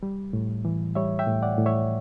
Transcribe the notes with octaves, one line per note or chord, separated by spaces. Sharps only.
G3
A2
E3
G3 C#5 E5
E5 G5
A2
D5 F#5
A2
C#5 E5